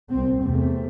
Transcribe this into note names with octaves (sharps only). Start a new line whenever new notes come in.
C2 C4
E2 C3 A3 C4